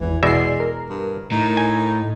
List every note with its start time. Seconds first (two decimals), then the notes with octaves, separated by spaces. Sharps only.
0.01 G#1 E2 E3
0.23 E2 B2 G#3 D5 E5 C7
0.60 A#4
0.89 G2
1.32 A2 D#4
1.57 G#5